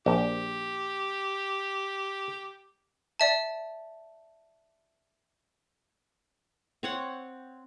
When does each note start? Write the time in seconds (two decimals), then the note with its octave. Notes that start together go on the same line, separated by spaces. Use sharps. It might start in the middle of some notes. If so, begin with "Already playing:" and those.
0.06 A#1 G4
3.20 D5 E5 A5
6.83 C4 C#5 F#5